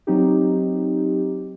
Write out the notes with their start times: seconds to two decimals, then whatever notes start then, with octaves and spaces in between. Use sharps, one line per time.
0.07 F#3 C4 D#4 G4